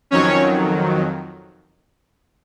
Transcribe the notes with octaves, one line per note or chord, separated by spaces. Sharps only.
F2 D#3 F#3 C#4 C#5